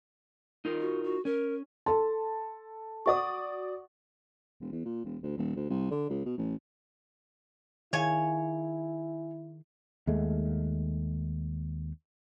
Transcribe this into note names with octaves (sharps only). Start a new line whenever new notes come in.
D#4 F4 A#4
F#4
F#4
C#4 A#4
A4 A5 C6
F#4 D5 F#5 C#6 D#6
E1
E2
A#2
E1
D2
D#1
D2
C2
D3
C#2
B2
A1
D#3 E4 G#4 C#5 F5 G#5
D#2 G#3 A3